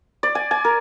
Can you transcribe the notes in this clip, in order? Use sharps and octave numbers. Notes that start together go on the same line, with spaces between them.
D5
G#5
G#5
A#4